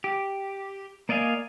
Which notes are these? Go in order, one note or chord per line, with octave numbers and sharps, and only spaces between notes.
G4
A#3 D5 D#5 F5 G#5